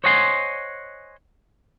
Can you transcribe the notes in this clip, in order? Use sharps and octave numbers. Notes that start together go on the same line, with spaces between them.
C5 C#5 D#5 F#5 G#5 C6